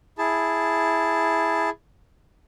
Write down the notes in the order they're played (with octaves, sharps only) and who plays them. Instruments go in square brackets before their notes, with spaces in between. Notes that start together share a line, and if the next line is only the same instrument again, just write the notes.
[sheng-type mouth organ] E4 G#4 A5